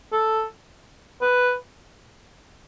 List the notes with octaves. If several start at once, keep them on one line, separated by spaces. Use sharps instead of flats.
A4
B4